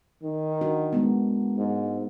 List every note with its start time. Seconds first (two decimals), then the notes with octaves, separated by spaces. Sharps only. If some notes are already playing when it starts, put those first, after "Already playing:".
0.23 D#3
0.61 D4 F#4 A#4
0.93 G#3 B3
1.57 G#2